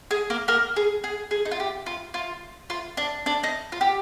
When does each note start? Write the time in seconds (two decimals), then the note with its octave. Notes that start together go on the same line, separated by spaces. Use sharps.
0.11 G#4
0.30 A#3 A#4
0.48 A#3 A#4
0.76 G#4
1.04 G#4
1.31 G#4
1.45 D#4
1.51 F4
1.60 G4
1.86 F4
2.14 F4
2.70 F4
2.97 D4
3.26 D4
3.44 D#4
3.72 F4
3.81 G4